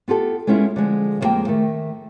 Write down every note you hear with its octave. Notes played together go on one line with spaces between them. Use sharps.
B3 F4 G4 A4
G#3 B3 C#4 E4 F4
D3 F3 G#3
F2 C3 F3 G#3 A#3 G5
D#3 A3